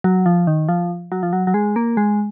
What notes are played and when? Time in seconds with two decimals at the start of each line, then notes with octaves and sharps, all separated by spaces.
0.04 F#3
0.26 F3
0.47 D#3
0.69 F3
1.12 F#3
1.23 F3
1.33 F#3
1.47 F#3
1.54 G#3
1.76 A#3
1.97 G#3